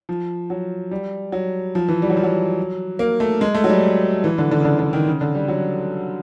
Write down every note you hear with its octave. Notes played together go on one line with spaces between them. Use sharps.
F3
F#3
G3
F#3
F3
E3
G3
F#3
F3
F#3
A#3
A3
G#3
A3
F#3
G3
E3
D3
D3
C#3
D3
D3
D#3
C#3
D3
G3
F#3